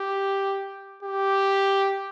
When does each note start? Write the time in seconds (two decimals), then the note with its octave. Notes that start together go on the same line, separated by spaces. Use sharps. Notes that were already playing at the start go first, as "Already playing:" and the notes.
Already playing: G4
1.03 G4